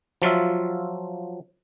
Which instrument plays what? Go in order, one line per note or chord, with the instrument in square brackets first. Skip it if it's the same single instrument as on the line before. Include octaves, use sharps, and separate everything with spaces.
[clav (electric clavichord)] F3 F#3 F4 E5